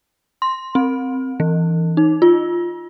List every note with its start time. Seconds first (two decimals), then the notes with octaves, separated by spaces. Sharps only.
0.42 C6
0.75 C4
1.40 E3
1.97 D#4
2.22 F4